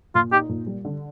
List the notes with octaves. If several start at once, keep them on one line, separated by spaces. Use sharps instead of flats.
A#2 F4
D#4 G4
A#2
G3
D3